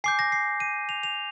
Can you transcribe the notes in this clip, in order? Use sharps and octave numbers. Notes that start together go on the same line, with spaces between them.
G#5 D6 G6 C7
A#6
C7
D#7
F7
F7